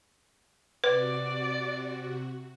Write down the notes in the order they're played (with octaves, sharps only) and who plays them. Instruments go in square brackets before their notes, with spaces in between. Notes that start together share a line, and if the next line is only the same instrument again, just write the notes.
[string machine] C3 F#4 [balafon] B4 [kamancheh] D5